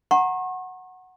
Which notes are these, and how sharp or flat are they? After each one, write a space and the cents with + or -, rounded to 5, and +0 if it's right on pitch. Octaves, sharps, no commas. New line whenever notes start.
F#5 +0 A#5 +0 C#6 -45